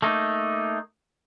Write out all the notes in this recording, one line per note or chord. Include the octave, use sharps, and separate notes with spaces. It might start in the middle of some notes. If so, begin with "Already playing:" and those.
A3 A#3 D#4